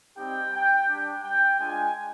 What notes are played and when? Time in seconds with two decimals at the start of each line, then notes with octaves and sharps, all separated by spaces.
0.17 G3 C4 D#4 G4 G5
0.53 G5
0.88 G3 D4 G4 G5
1.24 G5
1.60 G#3 D4 F4 G#5